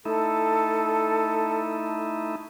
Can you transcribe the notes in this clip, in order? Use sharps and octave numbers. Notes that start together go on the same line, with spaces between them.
A3 D#4 E4 A4